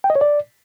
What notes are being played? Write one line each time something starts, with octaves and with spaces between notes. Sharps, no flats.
G5
D#5
C#5
D5